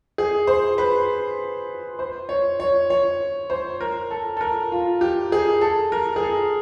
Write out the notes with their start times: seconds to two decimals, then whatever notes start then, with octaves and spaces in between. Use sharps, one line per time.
0.18 G#4
0.47 C5
0.78 B4
1.99 C5
2.29 C#5
2.60 C#5
2.90 C#5
3.50 C5
3.81 A#4
4.11 A4
4.37 A4
4.41 A#4
4.72 F4
5.01 G4
5.32 G#4
5.61 A4
5.92 A#4
6.16 G#4
6.23 A4